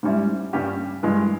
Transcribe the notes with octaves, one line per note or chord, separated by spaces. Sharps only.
G#2 G3 C#4 E4
G2 G3 C#4 G4
G2 E3 G#3